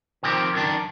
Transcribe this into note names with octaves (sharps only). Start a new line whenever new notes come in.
D#3 F3 C4 G4
F#2 D#3 D4